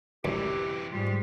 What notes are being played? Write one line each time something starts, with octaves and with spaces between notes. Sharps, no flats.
F#2 C3 E3 G4
G#2 G3 F4